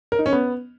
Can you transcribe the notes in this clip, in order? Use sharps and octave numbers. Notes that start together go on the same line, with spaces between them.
A#4
D#4
C#4
B3